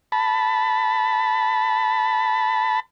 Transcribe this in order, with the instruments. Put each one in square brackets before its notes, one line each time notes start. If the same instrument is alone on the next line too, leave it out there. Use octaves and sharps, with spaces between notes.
[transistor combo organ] A5 B5